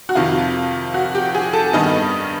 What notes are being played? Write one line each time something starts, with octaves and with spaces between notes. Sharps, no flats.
F#4
F2 C3 D#3 F4
F#4
G4
G#4
A4
G2 D#3 G3 B3 D#5